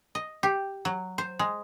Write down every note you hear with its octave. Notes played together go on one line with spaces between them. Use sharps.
D#5
G4
F#3
C5
G#3